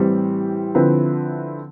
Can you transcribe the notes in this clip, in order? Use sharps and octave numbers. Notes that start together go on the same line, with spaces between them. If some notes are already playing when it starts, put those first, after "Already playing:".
Already playing: A2 E3 G3 C4 G4
D3 F3 C4 E4 B4